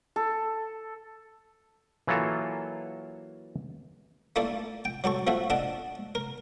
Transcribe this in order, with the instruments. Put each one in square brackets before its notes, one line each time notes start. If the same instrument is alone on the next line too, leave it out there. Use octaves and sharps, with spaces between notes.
[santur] A4
[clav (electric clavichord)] E3 F#3 A#3 F4 A4
[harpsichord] A3 A#3 E4 A4 D5
G5
F#3 G4 A4 C#6
F3 A3 F#4 E5
D4 A4 D#5 F#5
A#4